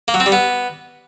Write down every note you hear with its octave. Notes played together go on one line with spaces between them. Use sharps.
A#3
F#3
C4
G3
B3